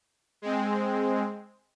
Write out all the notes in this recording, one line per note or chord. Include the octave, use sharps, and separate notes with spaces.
G#3 C4